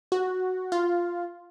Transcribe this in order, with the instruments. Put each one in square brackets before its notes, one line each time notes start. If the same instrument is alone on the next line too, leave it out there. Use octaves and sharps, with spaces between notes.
[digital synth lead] F#4
F4